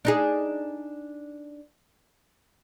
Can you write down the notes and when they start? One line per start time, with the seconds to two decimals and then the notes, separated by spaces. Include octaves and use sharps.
0.05 D4 D#4 G#4